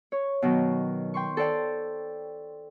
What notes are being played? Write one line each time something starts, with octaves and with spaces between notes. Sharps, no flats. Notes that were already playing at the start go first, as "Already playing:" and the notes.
C#5
B2 D#3 F#3
G5 C6 C#6
A4 C5 D5 G5